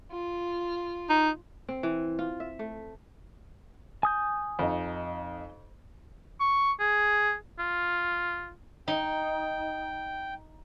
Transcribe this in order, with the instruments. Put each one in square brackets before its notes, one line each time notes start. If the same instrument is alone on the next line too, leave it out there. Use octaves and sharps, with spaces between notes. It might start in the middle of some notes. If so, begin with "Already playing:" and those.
[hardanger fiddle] F4
[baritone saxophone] D#4
[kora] C4
E3
F4
E5
A3
[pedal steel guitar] G#5 D#6 G6
[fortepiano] F2 D#4
[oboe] C#6
G#4
F4
[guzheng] D#4 [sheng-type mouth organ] G5